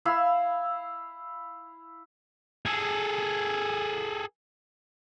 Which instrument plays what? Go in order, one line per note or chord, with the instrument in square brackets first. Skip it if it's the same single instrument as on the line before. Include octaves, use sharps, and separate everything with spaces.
[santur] E4 F5 B5 E6
[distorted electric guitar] G#4 A4